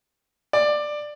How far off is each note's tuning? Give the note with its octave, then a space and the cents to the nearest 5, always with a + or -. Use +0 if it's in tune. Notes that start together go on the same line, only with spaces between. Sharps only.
D5 +15